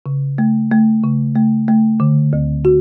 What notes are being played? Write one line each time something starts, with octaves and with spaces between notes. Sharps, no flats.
C#3
A3
A3
C#3
A3
A3
D3
D2
F#4